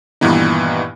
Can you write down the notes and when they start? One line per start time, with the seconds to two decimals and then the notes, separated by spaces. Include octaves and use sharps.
0.21 G2 A#2 D#3 E3 B3 D#4